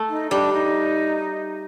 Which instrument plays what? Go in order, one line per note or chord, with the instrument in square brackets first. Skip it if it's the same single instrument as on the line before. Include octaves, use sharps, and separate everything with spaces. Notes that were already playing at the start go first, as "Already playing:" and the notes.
Already playing: [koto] A3
[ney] D#4
[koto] G3 [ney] D4
[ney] D#4